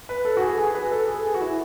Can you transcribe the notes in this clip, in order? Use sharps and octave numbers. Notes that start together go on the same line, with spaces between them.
B4
A4
F#4
G#4
G#4
B4
A4
G#4
G#4
F#4
E4